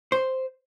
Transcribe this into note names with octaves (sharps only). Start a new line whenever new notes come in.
C5